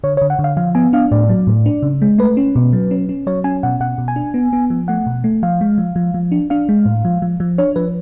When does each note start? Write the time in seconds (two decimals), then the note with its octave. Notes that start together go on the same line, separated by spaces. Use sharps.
0.04 D3 C#5
0.17 D3 C#5
0.30 F#5
0.39 D3
0.44 F5
0.57 F3 F5
0.75 B3 G#5
0.93 D4 F5
1.11 A2 D5
1.29 F#3
1.47 A2
1.66 D4
1.82 C#3
2.02 G#3
2.18 A3 B4
2.37 C#4
2.56 B2
2.73 F#3
2.91 C#4
3.09 C#4
3.27 F#3 C#5
3.44 C#4 G#5
3.63 B2 F#5
3.80 B2 F#5
3.98 B2
4.08 G#5
4.16 D4
4.34 B3
4.53 B3
4.70 F3
4.88 A3 F#5
5.06 B2
5.24 A3
5.43 F3 F5
5.61 G#3
5.78 F3
5.96 F3
6.14 F3
6.32 D4
6.50 D4 F5
6.69 G#3
6.85 A2
7.05 F3
7.22 F3
7.40 F3
7.58 D4 C#5
7.76 F3 B4